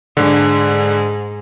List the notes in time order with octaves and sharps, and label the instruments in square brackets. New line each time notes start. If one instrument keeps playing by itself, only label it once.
[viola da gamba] G#2 [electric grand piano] D3